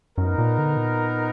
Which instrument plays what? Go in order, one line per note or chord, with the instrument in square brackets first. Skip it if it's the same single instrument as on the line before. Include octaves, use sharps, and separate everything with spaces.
[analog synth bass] F#2 [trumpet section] B3 D#4 A#4
[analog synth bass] A#2
D3
A#2